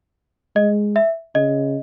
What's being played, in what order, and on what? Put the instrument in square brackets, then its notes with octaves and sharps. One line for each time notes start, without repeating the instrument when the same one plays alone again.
[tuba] G#3 [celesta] D#5
[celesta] E5
[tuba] C#3 [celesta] D#5